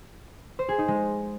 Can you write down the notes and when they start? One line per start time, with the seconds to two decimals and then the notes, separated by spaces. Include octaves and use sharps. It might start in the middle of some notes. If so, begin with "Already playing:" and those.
0.59 C5
0.69 G#4
0.78 D#4
0.88 G#3